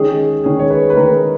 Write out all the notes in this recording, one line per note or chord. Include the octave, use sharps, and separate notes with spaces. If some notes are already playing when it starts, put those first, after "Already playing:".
Already playing: D#3 G#3 C#4 G#4
D#3 G#3 C#4 G#4
C#5
B4
B4
D#3 G#3 C#4 A#4